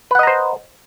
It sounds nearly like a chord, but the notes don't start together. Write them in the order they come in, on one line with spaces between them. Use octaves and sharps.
B4 F#5 D#5 A#5 C5